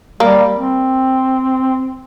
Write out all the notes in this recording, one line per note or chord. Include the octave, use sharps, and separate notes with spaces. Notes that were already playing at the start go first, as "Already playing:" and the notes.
G3 A#3
C4